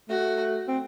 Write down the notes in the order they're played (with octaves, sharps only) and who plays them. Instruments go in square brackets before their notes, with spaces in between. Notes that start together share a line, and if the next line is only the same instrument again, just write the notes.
[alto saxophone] A3 [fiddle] F#4
[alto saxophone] C4